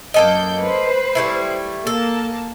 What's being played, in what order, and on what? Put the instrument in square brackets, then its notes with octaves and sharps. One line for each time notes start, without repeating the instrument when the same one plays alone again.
[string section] F#2 G6 [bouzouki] A#3 A4 D#5
[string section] B4 C5
[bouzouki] G3 A3 E4
[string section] A#3 A5 [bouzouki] A4